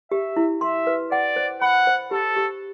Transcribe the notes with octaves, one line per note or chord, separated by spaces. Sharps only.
G4 E5
E4
E5 C6
B4
D5 F#5
C5
F#5 B5
C5
G4 A4
G4